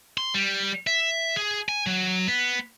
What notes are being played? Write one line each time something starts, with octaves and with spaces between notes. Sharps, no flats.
C6
G3
E5
G#4
G#5
F#3
B3